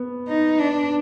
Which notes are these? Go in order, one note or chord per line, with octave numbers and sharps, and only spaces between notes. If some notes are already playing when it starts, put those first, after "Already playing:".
Already playing: B3
D#4
D4